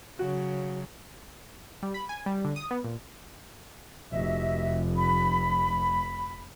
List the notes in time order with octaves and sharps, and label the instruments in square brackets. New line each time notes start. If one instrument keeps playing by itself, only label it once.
[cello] C#3 F#3 [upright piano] F#4
[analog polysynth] G3
B5
G#5
G3
D3
D#6
B3
A#2
[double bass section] F1 [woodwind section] F#4 D#5 E5
[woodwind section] B5